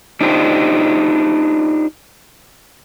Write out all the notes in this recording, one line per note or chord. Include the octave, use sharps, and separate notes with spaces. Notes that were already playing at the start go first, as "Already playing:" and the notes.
D4 D#4 F4 G4 C5 D#5